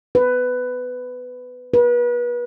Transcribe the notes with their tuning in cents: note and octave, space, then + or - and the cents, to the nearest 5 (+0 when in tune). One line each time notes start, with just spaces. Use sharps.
B4 +15
B4 -35